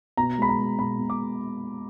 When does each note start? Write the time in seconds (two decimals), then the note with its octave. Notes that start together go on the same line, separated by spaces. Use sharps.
0.17 B2 A#5
0.38 G#3 B5
0.49 A#5
0.59 G#3
0.78 B2 B5
0.99 B2
1.10 D6